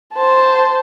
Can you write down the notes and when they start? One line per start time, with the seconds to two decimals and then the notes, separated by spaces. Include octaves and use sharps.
0.14 C5 A5